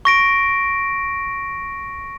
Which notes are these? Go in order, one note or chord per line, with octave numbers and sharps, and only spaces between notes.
C#6 A#6 D7